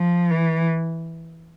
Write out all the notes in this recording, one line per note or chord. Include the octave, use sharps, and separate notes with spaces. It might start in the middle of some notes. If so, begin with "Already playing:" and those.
Already playing: F3
E3